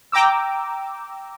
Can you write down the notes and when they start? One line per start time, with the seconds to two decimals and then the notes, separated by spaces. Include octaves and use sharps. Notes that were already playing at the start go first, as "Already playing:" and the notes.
0.12 G5 A#5 D6 E6